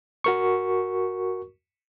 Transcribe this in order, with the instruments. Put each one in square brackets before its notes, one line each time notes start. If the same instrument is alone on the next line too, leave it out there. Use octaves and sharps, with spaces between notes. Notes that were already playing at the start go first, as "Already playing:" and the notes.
[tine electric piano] F#4 A#4 C#6